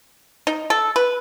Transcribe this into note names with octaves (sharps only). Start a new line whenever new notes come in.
D#4
A4
B4